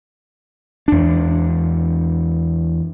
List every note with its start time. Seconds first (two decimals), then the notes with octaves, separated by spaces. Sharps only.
0.88 E2 D4